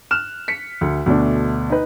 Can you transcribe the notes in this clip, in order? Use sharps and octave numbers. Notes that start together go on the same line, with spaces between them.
F6 F#6 E7
B6 C#7
D2
D2 B2 A3 D4
D#4 B4